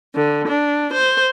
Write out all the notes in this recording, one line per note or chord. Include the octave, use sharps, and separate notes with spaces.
D3
D4
C5